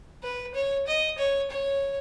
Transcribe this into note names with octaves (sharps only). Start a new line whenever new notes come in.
B4
C#5
D#5
C#5
C#5